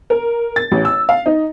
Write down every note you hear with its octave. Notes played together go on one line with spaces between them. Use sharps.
A#4
A6
A1
E6
F5
D#4